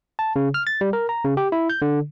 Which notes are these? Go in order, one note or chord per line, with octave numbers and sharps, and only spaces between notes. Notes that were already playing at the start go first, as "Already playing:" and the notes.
A5
C#3
F6
A6
G3
A#4
A#5
C#3
G4
E4
G6
D3